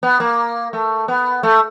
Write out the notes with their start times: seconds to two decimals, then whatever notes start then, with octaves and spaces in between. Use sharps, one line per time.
0.03 B3
0.20 A#3
0.73 A3
1.08 B3
1.43 A3